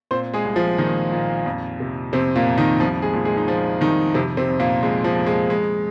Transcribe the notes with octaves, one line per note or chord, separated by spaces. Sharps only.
A#2 C4 C5
G#3 G#4
C2
F3 F4
A#2 D#3 D#4
A#2
F2
C3
F2 C3 C4
A#2 A#3
F2
D#3 D#4
C2 F3 F4
G#3 G#4
A#2
G#3 G#4
D#4
A#2 F3 F4
C2 D#3 D#4
F2 C3 C4
C3 C4
F2
A#2 A#3
F2 G#3
F3
F2
G#3
F2 G#3